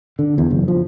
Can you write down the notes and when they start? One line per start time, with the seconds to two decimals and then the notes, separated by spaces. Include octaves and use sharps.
0.19 D3
0.38 E2
0.50 F#1
0.68 F3